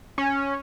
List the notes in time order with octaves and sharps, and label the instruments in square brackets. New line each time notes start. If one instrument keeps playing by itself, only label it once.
[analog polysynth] C#4